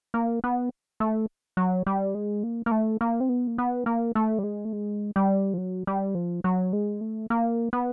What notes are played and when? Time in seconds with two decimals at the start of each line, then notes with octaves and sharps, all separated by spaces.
0.14 A#3
0.44 B3
1.00 A3
1.57 F#3
1.86 G3
2.15 G#3
2.43 A#3
2.66 A#3
2.71 A3
3.01 A#3
3.20 C4
3.29 B3
3.47 A#3
3.58 B3
3.86 A#3
4.15 A3
4.38 G3
4.43 G#3
4.65 A3
4.73 G#3
5.16 G3
5.54 F3
5.58 F#3
5.87 G3
6.15 F3
6.44 F#3
6.73 G#3
7.01 A3
7.30 A#3
7.73 B3